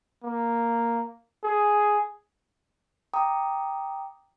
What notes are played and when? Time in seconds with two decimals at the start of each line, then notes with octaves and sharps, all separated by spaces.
0.24 A#3
1.44 G#4
3.14 G5 A#5 D6 D#6